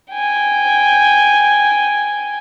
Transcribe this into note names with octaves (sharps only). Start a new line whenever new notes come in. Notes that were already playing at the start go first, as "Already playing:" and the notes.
G5 G#5